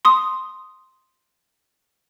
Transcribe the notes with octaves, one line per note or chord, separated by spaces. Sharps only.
C6 D#6